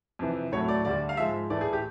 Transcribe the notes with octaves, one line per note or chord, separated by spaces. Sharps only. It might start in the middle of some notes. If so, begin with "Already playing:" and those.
F2 C3 E3
A2 F#3 A3 C#5
D5
D2 D3 G3 D5
F5
G#2 F3 G#3 E5
A2 E3 A3 D5
G#4
G4